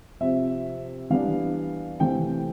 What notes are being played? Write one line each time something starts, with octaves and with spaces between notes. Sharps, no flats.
C3 F3 C4 E5
E3 G3 B3 D4 F5
C3 E3 A3 C4 G5